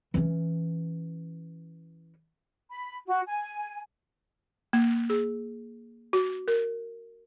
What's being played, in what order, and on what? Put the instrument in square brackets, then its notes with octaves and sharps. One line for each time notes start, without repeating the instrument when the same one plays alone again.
[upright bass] E3 C#4
[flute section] B5
F#4
G#5
[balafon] A#3
G#4
F#4
A#4